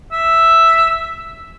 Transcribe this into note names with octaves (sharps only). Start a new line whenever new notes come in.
E5